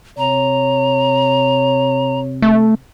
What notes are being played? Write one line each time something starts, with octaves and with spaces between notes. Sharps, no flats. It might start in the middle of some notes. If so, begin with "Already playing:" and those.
C3 C#5 A#5
A3